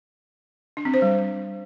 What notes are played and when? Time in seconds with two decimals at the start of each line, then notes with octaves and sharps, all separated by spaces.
0.77 D4
0.85 C4
0.94 C5
1.02 G3